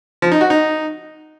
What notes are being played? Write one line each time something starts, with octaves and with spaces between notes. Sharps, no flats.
F3
D#4
F#4
D#4